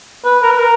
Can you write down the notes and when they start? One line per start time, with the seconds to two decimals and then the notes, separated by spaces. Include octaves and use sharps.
0.25 B4
0.43 A#4
0.51 B4
0.59 A#4